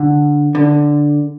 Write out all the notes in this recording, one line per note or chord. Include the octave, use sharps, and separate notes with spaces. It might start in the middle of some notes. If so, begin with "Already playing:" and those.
Already playing: D3
D3